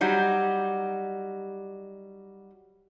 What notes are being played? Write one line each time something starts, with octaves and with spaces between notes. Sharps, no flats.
F#3 G3 D#4